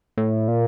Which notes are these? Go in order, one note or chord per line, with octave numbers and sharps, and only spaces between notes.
A2
A#2